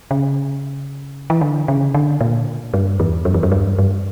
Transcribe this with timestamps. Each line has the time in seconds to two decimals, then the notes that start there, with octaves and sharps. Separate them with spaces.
0.11 C#3
1.30 E3
1.41 D3
1.68 C#3
1.94 D3
2.21 A#2
2.74 G2
3.00 E2
3.25 F#2
3.34 E2
3.43 F#2
3.52 G2
3.78 G2